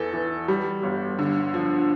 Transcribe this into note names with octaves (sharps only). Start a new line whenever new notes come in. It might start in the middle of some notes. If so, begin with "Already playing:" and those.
Already playing: E2 E3 A4
E3
G3
G1
D3
F3